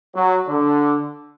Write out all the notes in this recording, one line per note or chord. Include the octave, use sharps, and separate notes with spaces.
F#3
D3